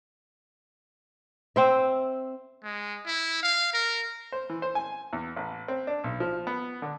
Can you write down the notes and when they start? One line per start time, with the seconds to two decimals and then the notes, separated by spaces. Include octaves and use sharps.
1.56 C4 C5 E5
2.64 G#3
3.06 E4
3.43 F5
3.73 A#4
4.32 C5
4.49 E3
4.62 C5
4.75 G#5
5.13 E2
5.36 A1
5.68 C4
5.87 D4
6.04 B1
6.20 F3
6.47 B3
6.82 D3